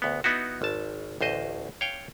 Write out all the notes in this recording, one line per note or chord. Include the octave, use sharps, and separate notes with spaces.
D2 B3
B3 D#4 E4 F#4
G#1 A5
A1 D2 C5 D#5
C#5 F5 G5